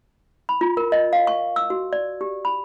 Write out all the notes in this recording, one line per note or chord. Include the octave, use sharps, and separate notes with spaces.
B5
F4
A#4
D#5
F5
C#6
E6
F#4
D5
G4
B5